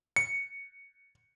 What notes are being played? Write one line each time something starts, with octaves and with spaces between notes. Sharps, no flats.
C#7